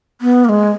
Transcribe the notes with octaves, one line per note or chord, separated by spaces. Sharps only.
B3
A#3
G#3